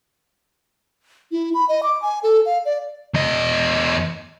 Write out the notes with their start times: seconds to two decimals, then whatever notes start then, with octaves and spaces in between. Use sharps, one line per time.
1.32 E4
1.54 B5
1.69 D#5
1.83 D6
2.02 G#5
2.23 A4
2.46 F5
2.65 D5
3.14 E2 D#5